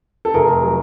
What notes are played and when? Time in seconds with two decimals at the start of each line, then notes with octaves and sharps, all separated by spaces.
0.25 A4
0.34 F1 G#4 A#4
0.62 F#3